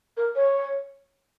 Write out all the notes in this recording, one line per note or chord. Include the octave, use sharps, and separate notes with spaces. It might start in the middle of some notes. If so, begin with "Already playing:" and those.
A#4
C#5